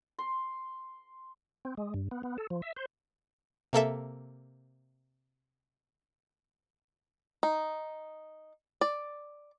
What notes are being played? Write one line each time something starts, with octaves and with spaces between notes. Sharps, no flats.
C6
C4
G#3
G2
B3
B3
A4
F3
E5
C5
C3 A#3 A4 E5
D#4
D5